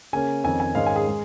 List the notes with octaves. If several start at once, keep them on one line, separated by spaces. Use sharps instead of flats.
C#3 A#3 C#4 G#5
F2 D#3 C#4 G#5
G#5
G#2 D#3 G#3 C#4 F5
G#5
G#4
G#3